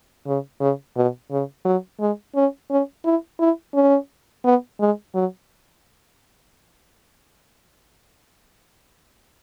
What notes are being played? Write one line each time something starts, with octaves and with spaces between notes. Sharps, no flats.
C#3
C#3
B2
C#3
F#3
G#3
C#4
C#4
E4
E4
C#4
B3
G#3
F#3